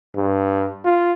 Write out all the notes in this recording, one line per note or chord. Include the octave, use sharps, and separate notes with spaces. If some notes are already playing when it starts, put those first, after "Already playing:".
G2
F4